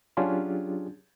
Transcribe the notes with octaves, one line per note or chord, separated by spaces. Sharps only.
F#3 C#4 D4 F4 G4 G#4